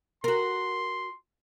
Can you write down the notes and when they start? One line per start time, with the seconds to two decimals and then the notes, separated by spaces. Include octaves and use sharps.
0.24 F#4 A#4 C6